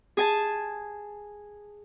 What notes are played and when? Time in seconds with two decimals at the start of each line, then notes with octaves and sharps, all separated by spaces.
0.17 G#4 G#5 A5